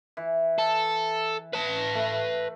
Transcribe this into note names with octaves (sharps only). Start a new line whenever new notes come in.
E3
A4
B4 A5
A3